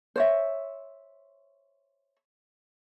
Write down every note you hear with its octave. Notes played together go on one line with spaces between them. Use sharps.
C5 C#5 E5